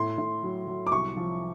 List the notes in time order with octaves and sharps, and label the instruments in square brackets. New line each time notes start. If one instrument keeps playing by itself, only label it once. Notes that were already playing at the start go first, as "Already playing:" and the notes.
Already playing: [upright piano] A2 C6
A2
F#3
F#3
D6
C2 C#6
F3